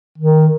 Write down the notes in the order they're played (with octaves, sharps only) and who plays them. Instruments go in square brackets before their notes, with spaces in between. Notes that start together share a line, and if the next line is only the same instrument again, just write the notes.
[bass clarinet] D#3